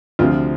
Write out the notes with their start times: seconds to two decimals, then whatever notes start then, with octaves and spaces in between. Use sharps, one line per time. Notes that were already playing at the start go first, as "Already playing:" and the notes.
0.19 D2 C3 F3 F4